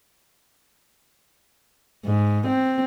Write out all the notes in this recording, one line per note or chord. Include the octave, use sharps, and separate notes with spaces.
G#2
C4